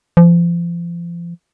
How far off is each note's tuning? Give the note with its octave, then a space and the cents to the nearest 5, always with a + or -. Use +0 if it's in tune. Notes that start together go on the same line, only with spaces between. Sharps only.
F3 -35